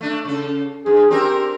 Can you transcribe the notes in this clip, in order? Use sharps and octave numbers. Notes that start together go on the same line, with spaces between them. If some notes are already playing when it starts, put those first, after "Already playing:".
A3 D4
C#3 A4
G2 G#4
C4 D4 G4 A#4